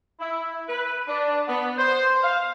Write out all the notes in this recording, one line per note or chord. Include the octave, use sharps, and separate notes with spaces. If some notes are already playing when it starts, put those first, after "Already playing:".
E4
B4
D4
B3
C5
F5